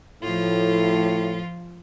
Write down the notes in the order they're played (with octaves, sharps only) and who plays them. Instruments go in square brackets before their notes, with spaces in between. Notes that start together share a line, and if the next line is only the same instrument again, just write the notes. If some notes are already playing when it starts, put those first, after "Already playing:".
[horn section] A2 [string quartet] F3 F4